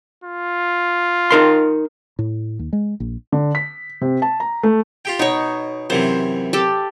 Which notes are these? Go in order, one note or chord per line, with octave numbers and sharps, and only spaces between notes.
F4
D#4 A#4 C6
A2
D#2
G#3
A#1
D3
B6
C3
A5
A#5
A3
F4 G4 G5
B2 D#4 C#5
F#2 C3 E3 C5
G4 A4